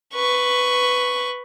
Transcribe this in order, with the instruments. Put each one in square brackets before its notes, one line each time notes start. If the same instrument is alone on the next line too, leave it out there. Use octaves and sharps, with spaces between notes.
[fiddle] B4 C#6